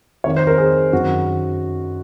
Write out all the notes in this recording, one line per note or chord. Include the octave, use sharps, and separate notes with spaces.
F2 D#3 C#5
C5
A#4
G#4
F#2 D#3 F#4